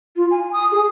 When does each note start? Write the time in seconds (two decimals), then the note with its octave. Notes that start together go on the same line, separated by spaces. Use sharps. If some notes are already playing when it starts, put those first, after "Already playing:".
0.16 F4
0.31 G#5
0.53 D#6
0.72 G#4